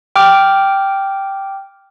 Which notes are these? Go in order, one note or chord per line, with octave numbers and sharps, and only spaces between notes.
G5 D6 F6